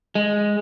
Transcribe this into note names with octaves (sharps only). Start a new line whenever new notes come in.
G#3